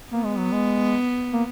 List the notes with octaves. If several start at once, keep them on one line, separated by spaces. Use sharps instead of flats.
A#3 B3
G#3
F#3
G#3
A#3